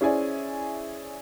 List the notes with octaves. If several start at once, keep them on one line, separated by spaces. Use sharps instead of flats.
C#4 E4 G#4 C5 D5 G#5